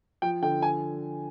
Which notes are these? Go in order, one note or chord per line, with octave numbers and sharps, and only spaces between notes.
F3 G5
D3 G5
G#5